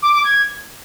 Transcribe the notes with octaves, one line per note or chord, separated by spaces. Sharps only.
D6
D6
G#6